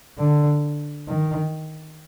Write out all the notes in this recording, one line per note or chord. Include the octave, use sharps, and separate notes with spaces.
D3
D#3